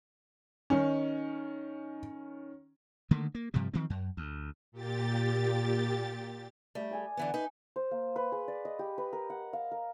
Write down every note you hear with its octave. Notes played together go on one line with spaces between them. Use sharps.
D#3 C#4 D#4
D3 D#3 A3 A#3
A#3
G2 C3 F3 G3
D#3 F3 C4
F#2
D2
A#2 G4 A6
G3 A3
A4 G#5 D#6
D3 E3 B3
D#4 B4
C5
A#3
B4
G#4
D5
D#5
G4
B4
A#4
F#5
F5
A#4